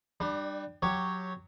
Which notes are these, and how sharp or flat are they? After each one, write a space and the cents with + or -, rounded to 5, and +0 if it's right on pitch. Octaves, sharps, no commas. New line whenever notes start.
G3 +0 D4 +35
F#3 -5 G4 +0 C#5 +0